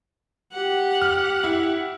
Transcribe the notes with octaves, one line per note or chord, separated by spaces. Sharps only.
G4 F#5
F6
E4